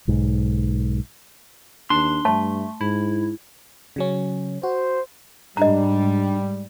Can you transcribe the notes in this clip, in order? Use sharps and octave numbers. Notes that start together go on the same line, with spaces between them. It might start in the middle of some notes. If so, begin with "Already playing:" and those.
B1 G#2
D#2 D4 C6
G2 A3 A5
G#2 E4
C#3 F#3 C#4
F#4 C5
G#2 G3 D4 D#5 A#5